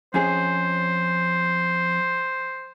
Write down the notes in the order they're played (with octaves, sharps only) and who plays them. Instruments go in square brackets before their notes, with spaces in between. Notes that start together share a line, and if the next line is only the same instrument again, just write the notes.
[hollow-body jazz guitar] F2 C#4 G#4 [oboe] C5